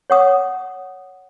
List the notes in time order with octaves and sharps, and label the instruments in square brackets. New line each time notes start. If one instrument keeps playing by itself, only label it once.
[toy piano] C#5 F#5 D#6